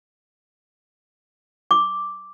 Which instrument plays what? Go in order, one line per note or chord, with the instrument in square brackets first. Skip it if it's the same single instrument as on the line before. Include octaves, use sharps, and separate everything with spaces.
[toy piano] D6